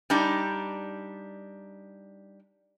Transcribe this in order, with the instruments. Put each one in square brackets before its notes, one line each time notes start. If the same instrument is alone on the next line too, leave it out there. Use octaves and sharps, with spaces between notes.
[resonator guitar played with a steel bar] G3 D4 D#4